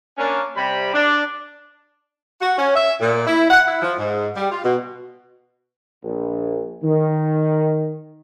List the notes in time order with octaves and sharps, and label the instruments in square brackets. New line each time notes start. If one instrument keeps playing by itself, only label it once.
[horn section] A#3 C#4 D4
C3 G3 B5
D4
[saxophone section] F#4
C#4
E5
A#2
E4
F#5
E4
F3
G#2
G3
F4
B2
[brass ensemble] A#1
D#3